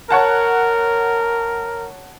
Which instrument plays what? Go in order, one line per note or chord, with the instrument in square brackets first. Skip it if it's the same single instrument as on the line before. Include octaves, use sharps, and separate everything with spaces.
[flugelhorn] A#4 [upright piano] C#5 F#5 A5